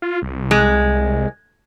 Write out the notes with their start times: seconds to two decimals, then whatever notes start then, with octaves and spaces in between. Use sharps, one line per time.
0.02 F4
0.22 C2
0.51 G#3